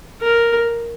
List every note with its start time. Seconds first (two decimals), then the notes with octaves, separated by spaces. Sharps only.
0.21 A#4